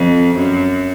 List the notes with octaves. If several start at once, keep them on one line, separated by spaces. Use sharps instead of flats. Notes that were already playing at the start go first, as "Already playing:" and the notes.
Already playing: F2
F#2